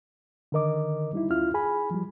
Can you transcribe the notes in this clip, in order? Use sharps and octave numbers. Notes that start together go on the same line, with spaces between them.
D3 D#3 A#4 D#5 D6
G3 D#4 E4
D2 C#4 E4 F4 F6
G#4 G#5 B5
F3 G3